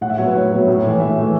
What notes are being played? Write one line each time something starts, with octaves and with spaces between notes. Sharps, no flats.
A2 F#5
E5
F#3 B3 C#5
B4
A2 C#5
F#3 B3
A2
E3 A3
A2 E5
E3 A3